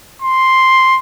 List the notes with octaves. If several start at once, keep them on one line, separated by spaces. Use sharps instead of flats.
C6